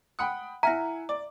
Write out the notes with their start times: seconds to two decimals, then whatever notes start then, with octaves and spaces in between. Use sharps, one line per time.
0.19 F#5 G5 B5 D#6 F#6
0.63 E4 E5 F#5 G#5 A#5 F6 A#6
1.09 D5 D6